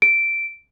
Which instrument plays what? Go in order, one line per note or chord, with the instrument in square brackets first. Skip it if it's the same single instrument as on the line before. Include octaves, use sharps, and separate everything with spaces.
[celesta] D7